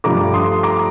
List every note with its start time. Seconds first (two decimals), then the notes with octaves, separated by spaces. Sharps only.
0.04 G2 F3 A3 A#5 D6
0.34 C6 D#6
0.63 A#5 D6